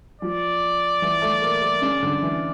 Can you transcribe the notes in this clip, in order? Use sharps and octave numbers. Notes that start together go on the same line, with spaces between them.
F3 D5
E3
A3
A#3
A#3
C#3
D3
E3